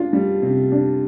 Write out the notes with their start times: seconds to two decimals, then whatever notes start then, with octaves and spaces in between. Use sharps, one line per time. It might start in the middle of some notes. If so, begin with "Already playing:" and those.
Already playing: D4 F4
0.13 G3
0.42 C3
0.72 D4